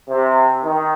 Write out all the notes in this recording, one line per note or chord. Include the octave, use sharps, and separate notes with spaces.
C3
D#3